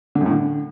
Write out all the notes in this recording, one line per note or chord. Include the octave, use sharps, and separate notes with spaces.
D3
F#2
A2
D3